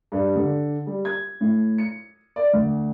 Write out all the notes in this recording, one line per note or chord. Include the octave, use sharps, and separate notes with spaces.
G2
D3
G3
G#6
A2
C#7
D5
D2